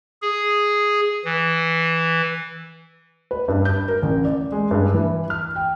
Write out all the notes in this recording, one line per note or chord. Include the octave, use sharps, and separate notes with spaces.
G#4
E3
B4
G2
G6
A#4
A1
D5
G#3
G2
E3
F6
G5